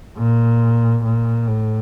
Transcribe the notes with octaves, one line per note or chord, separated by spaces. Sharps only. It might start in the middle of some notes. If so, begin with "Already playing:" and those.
A#2
A#2
A2